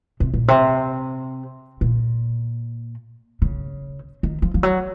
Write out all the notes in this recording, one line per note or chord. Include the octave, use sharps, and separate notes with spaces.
C3
A#2
C3
A#2
C#3
D#3
F3
F3
F#3